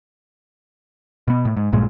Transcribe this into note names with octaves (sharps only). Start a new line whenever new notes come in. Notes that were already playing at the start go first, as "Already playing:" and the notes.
B2 B3
A2
G#2
A#1 G2 A#2 G#3